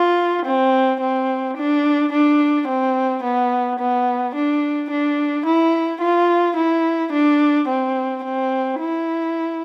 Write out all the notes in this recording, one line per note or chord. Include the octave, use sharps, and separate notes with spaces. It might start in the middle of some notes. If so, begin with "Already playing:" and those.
Already playing: F4
C4
C4
D4
D4
C4
B3
B3
D4
D4
E4
F4
E4
D4
C4
C4
E4